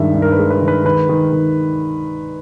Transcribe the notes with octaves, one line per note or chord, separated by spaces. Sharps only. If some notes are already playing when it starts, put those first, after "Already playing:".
Already playing: G2 D#3 G#3 E5
G2
A#4
B4
G#3
B4
D#3
B4
D#3 B4
D#3
D#3